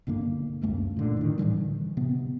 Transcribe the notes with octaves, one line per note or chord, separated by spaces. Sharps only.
B1 G2 D3 A#3
C#2 F#2 A3 A#3
A#2 D3
A2 D#3
A2 D3 E3 G3
C3 B3